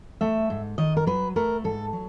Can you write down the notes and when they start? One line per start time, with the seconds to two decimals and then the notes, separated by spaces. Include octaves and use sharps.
0.21 A3 E5
0.50 G#2
0.78 D#3 D#5
0.97 A#4
1.06 F#3 B4
1.36 A3 A#4
1.64 G#2 A4
1.93 F#3